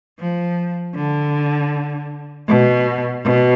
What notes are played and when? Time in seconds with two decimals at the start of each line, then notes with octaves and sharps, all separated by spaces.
0.19 F3
0.95 D3
2.48 B2
3.24 B2